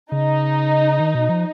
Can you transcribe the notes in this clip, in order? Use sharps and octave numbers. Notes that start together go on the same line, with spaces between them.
C#3 D#4
D#3
B2
F3